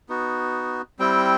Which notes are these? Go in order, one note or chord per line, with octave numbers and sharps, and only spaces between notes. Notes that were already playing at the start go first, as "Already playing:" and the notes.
B3 D#4 F#4
G3 C4 E4 G5